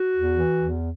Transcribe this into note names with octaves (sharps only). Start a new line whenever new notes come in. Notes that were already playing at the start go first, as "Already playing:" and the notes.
Already playing: F#4
E2
E3
E2